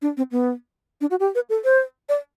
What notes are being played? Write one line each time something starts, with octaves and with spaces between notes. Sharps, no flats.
D4
C4
B3
D4
F#4
G4
B4
A4
C5
D5